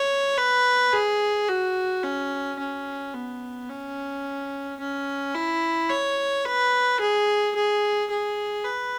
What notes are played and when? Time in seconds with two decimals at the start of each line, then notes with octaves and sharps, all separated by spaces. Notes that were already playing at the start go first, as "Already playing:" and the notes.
Already playing: C#5
0.38 B4
0.93 G#4
1.48 F#4
2.03 C#4
2.59 C#4
3.14 B3
3.69 C#4
4.80 C#4
5.35 E4
5.90 C#5
6.45 B4
7.00 G#4
7.55 G#4
8.10 G#4
8.65 B4